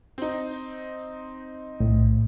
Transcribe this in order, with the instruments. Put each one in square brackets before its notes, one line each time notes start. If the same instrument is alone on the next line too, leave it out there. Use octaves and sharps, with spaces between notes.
[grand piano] C4 D#4
[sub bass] B1 [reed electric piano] A2